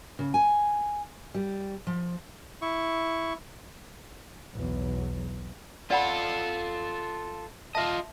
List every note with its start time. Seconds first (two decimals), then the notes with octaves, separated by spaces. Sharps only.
0.19 C#3
0.34 G#5
1.35 G3
1.87 F3
2.62 E4 C#6
4.54 B1 E2 F#3
5.91 F4 A4 D5 F#5 B5
7.75 F4 D#5 E5 A5